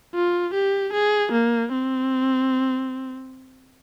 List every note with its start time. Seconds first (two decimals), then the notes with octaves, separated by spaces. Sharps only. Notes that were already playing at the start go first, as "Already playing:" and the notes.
0.14 F4
0.54 G4
0.93 G#4
1.32 A#3
1.72 C4